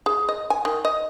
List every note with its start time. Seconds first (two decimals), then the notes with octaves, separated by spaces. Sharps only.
0.06 G#4
0.29 D#5
0.50 G#5
0.65 D#3
0.85 D#5